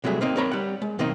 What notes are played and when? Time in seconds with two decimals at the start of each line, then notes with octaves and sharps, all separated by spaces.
0.04 C3 F#3 G3 A3 G#4
0.21 A#3 C4 D#4
0.37 C4 A#4 C#5 A#5 B5
0.51 G3 F#5
0.82 G#3
0.99 B1 D#3 A#3 C4 D#4 D#5